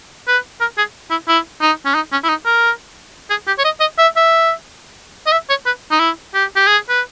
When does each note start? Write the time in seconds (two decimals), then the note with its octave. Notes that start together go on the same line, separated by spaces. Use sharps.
0.27 B4
0.61 A#4
0.78 G#4
1.11 E4
1.28 E4
1.61 D#4
1.85 C#4
1.95 D#4
2.12 C#4
2.24 E4
2.29 D#4
2.45 A#4
3.30 G#4
3.47 G4
3.59 C#5
3.65 D#5
3.80 D#5
3.98 E5
4.16 E5
5.26 D#5
5.32 E5
5.49 C#5
5.66 B4
5.91 D#4
6.00 E4
6.34 G4
6.56 G4
6.67 G#4
6.89 B4